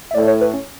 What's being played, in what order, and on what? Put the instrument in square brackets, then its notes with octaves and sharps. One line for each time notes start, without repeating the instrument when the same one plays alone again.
[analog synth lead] E5
[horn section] A2 [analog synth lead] D5
[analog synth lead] C#5
B4
C#4